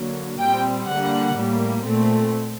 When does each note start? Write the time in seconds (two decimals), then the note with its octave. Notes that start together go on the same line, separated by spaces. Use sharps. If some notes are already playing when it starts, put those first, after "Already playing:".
Already playing: D3 F#3 A#3
0.40 A#2 G3 C4 G5
0.88 D3 G3 A#3 F#5
1.35 A2 G3 A#3
1.84 A#2 A3 C4